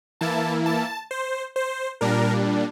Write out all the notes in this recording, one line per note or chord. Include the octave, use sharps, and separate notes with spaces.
E3 A#3 E4 A5
A5
C5
C5
A#2 G3 D4 A#4